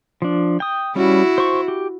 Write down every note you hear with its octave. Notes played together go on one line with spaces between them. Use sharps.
F3 D4
G5 D#6
G3 C#4 E4 F#4
C5 C#6
G4